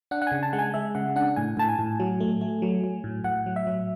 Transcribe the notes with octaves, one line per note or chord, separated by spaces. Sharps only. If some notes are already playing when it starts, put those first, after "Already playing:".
D4 F#5
F#5
C#3 G#5
A5
G#3 F#5
G#5
G#3 E5
C#3 F#5
D4 F#5
A2 G#5
A2 A5
G#5
A2
F#3
A3
A3
F#3
F#3
A2
A2 F#5
F#3
E5
F#3